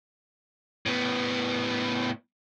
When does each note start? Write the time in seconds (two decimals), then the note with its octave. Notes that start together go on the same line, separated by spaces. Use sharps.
0.86 A2 B3